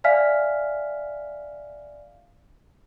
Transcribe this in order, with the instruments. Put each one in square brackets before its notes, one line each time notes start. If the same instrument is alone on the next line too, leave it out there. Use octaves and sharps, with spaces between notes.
[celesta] D5 E5 F5 G#5 F6 B6